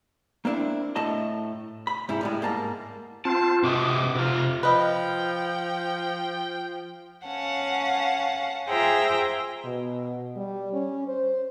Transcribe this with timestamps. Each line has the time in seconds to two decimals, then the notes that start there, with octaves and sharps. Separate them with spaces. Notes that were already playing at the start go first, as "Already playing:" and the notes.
0.45 A#3 C4 D4 E4
0.96 A2 A3 D#5 A5 A#5
1.87 B5
2.09 G#2 C3 E4
2.21 A2 G3 G#3
2.42 G#2 A#3 A5 A#5
3.25 C4 F4 A5
3.64 C3 F#4 D#5 D6
4.15 C3 F4 A#5
4.63 F3 B4 D#5 G5
7.25 C#4 F5 F#5 A5
8.68 F4 G#4 C5 E5 G5 A#5
9.65 B2
10.36 G3
10.73 C#4
11.07 C5